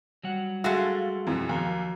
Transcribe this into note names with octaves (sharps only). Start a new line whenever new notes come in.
F#3 G3 F#5
G#3 A3 F#4 F5 E6 A6
F2 B2 E3
D#2 F3 F#3